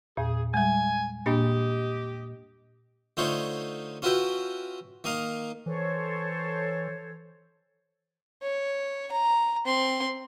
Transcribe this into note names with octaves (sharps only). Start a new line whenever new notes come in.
E2 A#2 G#4
G3 G#3 G#5
A#2 A#3 D4 G4 D#5
D3 A3 D#4 F4 C5 C#5
C#4 F4 F#4 B4 E5 G5
D#3 A#3 D#5 F5
E3 A4 C5 C#5
C#5
A#5
C4 C6